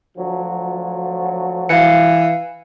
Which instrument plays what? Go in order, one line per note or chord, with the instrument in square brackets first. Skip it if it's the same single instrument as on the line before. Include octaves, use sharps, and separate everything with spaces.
[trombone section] D2 F3 F#3
[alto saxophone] E3 [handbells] F5 C#7